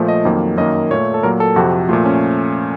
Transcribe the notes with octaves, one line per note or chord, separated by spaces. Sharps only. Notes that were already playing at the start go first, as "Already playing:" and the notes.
Already playing: A#2 F3 A3
D#5
F2 D#3 F#3 A#3
F#2 D#3 A#3 D#5
A#2 A3 C#5
A4
A#2 F#3 A#3 A#4
A4
F2 C3 F3 F#4
A#2 F3 A3 F4
C#4